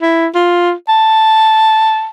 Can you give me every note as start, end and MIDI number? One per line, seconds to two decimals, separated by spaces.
0.01 0.27 64
0.35 0.72 65
0.89 2.10 81